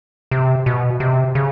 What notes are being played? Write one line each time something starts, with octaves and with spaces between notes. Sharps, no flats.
C3
B2
C3
C#3